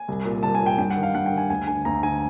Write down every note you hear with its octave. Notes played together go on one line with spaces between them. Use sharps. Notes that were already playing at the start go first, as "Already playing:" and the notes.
Already playing: G#5
C2
A#2
C2 A5
G#5
A#2 G5
G2 G5
F#5
D#3
F5
G2 F#5
G5
D#3
G#5
D2 G#5
D3 G#5
D2 A#5
D3 G#5